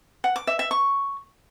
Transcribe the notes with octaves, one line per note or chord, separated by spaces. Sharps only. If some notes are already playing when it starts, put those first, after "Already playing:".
F#5
D6
E5
E5
C#6